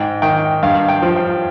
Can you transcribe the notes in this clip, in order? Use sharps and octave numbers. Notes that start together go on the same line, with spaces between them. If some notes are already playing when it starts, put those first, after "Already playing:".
Already playing: G#2 G5
D#3 G5
G2 F5
G5
F3
G5